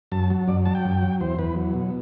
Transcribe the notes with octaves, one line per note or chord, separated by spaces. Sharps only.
F#2 A5
F#3
F#2 D5
F#3 A5
G5
F#2
F#3
E2 C5
E2 B4
F#3
B2